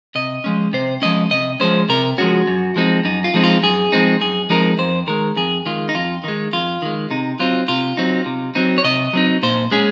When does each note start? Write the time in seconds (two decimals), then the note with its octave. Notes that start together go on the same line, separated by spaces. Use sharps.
0.15 C3 D#5
0.44 F3 G#3 C#4
0.73 C3 C5
1.02 F3 G#3 C#4 D#5
1.31 C3 D#5
1.60 F3 G#3 C#4 C5
1.89 C3 A#4
2.18 F3 G#3 C#4 F#4
2.47 F#2
2.76 F3 G#3 C4 D#4
3.05 F#2 D#4
3.24 F4
3.34 F3 G#3 C4 D#4
3.43 F4
3.63 F#2 G#4
3.92 F3 G#3 C4 D#4
4.21 F#2 G#4
4.50 F3 G#3 C4 D#4 A#4
4.79 F2 C5
5.07 D#3 G#3 A#4
5.36 F2 G#4
5.66 D#3 G#3 F4
5.89 D#4
5.94 F2 F4
6.24 D#3 G#3 D#4
6.53 F2 F4
6.82 D#3 G#3
7.11 C3 D#4
7.40 F#3 C4 D#4 F4
7.68 C3 F4
7.97 F#3 C4 D#4
8.26 C3
8.55 F#3 C4 D#4
8.78 C#5
8.84 C3 D#5
9.13 F#3 C4 D#4
9.43 A#2 C5
9.71 G#3 C#4 G#4